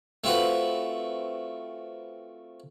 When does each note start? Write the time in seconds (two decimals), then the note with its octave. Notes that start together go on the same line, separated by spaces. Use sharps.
0.24 A3 C4 F4 F#4 B4